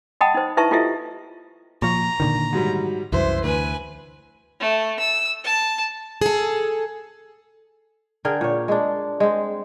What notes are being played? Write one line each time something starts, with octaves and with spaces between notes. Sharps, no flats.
D#5 F#5 G5 A5 B5 D#6
D#4 C5
D#4 E4 B4 E5 A5 C#6
E4 F4 G4 A4 D#5 E5
A#2 F3 A#5 C#6
A#2 D3 D#3
G#2 F#3 G3
C2 F#2 E3 C5 E5 C6
D2 B4 G#5
A3
E6
A5
G#4 A4
D3 G#4 A#4 G5
A#2 C#5
G#3 D4
G#3 C4